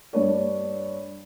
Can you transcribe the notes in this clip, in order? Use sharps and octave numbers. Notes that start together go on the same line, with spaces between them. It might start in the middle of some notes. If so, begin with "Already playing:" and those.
G2 D4 C#5